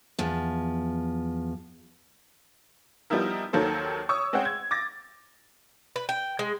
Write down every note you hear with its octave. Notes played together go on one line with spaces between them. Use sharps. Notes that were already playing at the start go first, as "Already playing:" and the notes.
E2 F3
F3 G3 B3 D#4 E4 A#4
D#2 D#3 F#3 A#3 A4 C5
C#5 C#6 D#6 E6
G#3 C4 C#4 G#4 F#5 G5
G#6
D6 A6 A#6
B4
G5
G#3